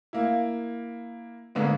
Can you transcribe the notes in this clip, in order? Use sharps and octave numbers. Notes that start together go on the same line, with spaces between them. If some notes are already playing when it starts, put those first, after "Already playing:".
A#3 E4
G#2 D3 G#3 A#3 B3